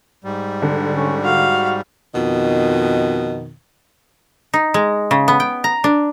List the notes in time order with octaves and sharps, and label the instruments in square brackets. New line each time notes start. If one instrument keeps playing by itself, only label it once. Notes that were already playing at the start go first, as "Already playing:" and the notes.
[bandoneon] G#2 G3
[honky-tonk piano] D3
[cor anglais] C#4
[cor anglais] F#4 [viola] F5
[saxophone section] F2 B2 D#3
[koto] D#4
G#3
C#3
B3
G5
A#5
D4